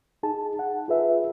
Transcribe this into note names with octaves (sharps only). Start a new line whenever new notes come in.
D#4 G#4 A5
F#5
F4 G#4 B4 E5